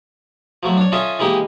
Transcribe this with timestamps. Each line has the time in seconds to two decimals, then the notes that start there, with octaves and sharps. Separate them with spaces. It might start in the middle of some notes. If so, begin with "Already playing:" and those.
0.63 F3 F#3 A3
0.77 D4 C#5
0.92 C#4 F4 A4 D#5 E5 G#5
1.19 E3 G#3 A#3 D#4 G4